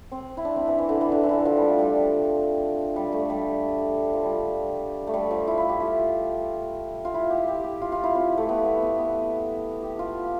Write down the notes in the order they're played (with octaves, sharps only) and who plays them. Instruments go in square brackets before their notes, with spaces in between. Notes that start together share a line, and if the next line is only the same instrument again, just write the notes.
[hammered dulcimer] C4
E4
D4
C4
E3
E3
D3
E3
D3
E3
D3
F3
G3
A3
G3
F3
G3
A3
G3
F3
G3
A3
G3
F3
E4
E4
G4
F4
F4
E4
G4
G4
G4
F4
F4
E4
C4
A3
B3
B3
B3
B3
G4
F4